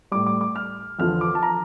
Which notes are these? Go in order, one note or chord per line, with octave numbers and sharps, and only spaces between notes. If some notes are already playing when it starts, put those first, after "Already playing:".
A2 G3 D6
D6
D6
F6
E2 D3 F3 F6
D6
A5
A#5